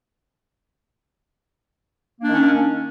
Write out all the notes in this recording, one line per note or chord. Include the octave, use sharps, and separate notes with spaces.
D#3 A#3 C#4 D4